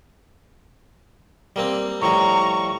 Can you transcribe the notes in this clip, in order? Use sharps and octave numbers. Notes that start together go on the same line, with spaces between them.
G3 A#3 C4
A2 F3 G3 A#5 C#6